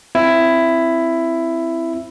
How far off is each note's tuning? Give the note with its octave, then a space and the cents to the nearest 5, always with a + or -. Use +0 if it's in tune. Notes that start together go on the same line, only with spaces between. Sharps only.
C4 +0 E4 +10